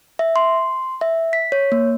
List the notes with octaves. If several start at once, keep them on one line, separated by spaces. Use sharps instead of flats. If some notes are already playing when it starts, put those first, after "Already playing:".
E5
C6
E5
B6
C#5
A#3